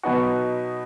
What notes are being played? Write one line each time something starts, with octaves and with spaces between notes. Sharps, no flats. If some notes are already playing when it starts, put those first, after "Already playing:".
B2 F#3 B3 D#4 F#4